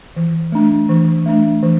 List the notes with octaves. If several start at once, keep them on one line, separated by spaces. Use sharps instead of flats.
E3
A3 D4
E3
A3 D4
E3